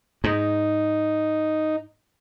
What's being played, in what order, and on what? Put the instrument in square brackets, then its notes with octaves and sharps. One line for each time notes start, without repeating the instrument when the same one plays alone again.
[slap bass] G#2 [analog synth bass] D#4